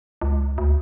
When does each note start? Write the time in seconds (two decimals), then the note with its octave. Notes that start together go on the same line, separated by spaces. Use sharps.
0.22 C#2
0.58 D2